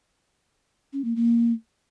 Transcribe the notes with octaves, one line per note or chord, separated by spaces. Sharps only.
C#4
A#3
A#3